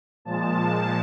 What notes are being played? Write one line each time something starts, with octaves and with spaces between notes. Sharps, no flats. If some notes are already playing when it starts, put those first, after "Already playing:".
A#2 F3 G#3 A5